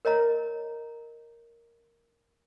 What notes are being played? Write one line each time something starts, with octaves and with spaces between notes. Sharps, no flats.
A#4 C#5 D#5 A#5